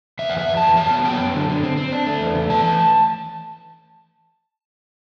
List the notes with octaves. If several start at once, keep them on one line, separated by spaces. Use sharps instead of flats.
E2 E5
F#5
E2
E5
E2
A5
E2
F#3 A5
B3
F#3 G5
F#2
D3
D3
C4
C4
D4
A3
E2
A3
E3 A5
E3